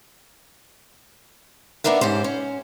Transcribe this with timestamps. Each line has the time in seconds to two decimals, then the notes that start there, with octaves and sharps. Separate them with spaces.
1.84 A#3 B3 D4 A#4 E5
2.01 G#2 C#4 G4 C5
2.24 C#4